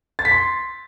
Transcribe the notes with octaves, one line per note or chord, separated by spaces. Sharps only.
A6
B6
C6